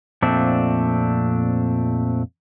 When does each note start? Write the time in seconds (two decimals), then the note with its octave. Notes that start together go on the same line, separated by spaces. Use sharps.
0.22 F2 A#2 A3 C4 D4